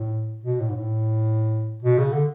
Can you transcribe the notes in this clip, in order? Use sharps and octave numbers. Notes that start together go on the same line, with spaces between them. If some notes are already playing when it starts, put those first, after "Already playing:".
Already playing: A2
B2
A2
G#2
A2
B2
C#3
D3